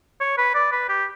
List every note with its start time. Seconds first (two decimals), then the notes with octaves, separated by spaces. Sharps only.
0.21 C#5
0.38 B4
0.55 D5
0.72 B4
0.89 G4